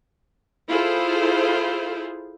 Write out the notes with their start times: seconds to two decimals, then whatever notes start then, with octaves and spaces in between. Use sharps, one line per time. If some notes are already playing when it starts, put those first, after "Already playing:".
0.69 E4 F4 G#4 A4 C5